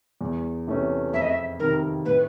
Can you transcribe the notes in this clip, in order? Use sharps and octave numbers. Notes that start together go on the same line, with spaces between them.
E2
C3 E3 A3 C#4
F2 E5
D#5
E5
C3 D#3 A#4
A2 B4